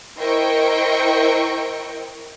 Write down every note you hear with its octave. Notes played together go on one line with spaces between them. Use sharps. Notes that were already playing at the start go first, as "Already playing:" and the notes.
E4 A#4 C5 D#5 G5 C#6